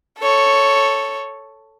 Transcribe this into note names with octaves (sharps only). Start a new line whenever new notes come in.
A4 C#5